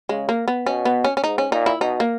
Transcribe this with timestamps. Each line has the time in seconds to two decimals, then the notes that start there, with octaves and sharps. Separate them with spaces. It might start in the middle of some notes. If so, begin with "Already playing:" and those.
0.09 C#3 G#3
0.29 A#3
0.48 B3
0.66 B2 C#4
0.85 B3
1.04 C#4
1.17 C#4
1.24 G#2 D#4
1.38 C#4
1.52 A#2 D#4
1.66 E4
1.81 B2 D#4
2.00 A#3